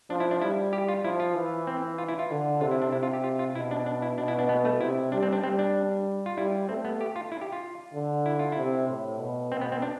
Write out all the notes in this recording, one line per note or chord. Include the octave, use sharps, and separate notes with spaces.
F3 D4
E4
D4
G3 E4
G4
F4
F3 E4
F4
E3
C4
F4
E4
F4
D3
C3 F4
E4
D4
C3 E4
F4
G4
F4
F4
B2 E4
D4
D4
E4
B2 D4
E4
D4
B3
A3
C3 E4
G3 D4
C4
D4
G3 C4
D4
F4
G3 E4
A3 C4
B3
G4
F4
E4
G4
F4
D3
E4
F4
C3 E4
A2
B2
B2 C4
B3
C4
D4